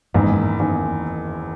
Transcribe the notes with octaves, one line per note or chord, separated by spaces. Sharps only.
F#1 E2 G#2 D#3
F#1 E2 D#3